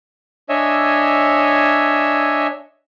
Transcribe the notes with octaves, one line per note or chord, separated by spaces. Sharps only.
D4 C#5 D#5 E5 G#5 E6